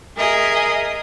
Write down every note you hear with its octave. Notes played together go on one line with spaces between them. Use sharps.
G#4 A#4 D#5 E5